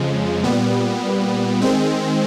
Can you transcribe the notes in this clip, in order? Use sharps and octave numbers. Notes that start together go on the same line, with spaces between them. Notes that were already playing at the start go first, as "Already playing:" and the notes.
Already playing: F2 C#3 F3 G#3
A#2 G3 B3
D#3 G#3 C4